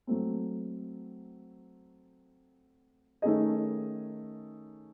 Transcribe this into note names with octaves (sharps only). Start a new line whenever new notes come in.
F#3 A3 C4
D#3 A3 C#4 G#4 D#5